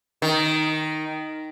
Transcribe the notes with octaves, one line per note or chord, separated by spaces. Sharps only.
D#3